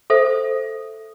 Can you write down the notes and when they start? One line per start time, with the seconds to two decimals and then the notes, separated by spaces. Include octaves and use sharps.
0.10 A4 C5 E5